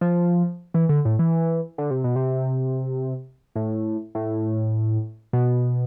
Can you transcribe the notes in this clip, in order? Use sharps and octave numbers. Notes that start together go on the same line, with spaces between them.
F3
E3
D3
A2
E3
D3
C3
B2
C3
A2
A2
B2